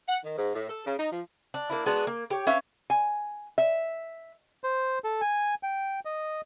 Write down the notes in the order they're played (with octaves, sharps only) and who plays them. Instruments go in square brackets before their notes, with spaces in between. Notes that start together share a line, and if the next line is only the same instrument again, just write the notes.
[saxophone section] F#5
D#3
G#2
A2
A4
C#3
D#4
F3
[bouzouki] D4
A#3 D4 E4
G#3 B3 D4 F#4
A#3
G4 C#5
C#4 B4 E5 F5
[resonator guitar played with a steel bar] G#5
E5
[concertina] C5
A4
G#5
G5
D#5